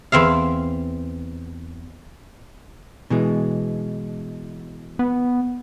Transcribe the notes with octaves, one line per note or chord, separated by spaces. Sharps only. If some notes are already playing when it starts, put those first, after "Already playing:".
E2 C4 E5 F5
B2 E3 G#3
B3